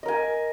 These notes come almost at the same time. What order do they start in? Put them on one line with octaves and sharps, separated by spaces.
D#5 A#4 G#5